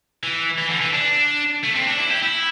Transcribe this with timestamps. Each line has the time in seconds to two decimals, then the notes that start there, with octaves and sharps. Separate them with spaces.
0.23 E3
0.58 E3
0.70 D3
0.82 E3
0.94 D4
1.64 A3
1.76 C4
1.88 D4
1.99 E4
2.11 G4
2.23 E4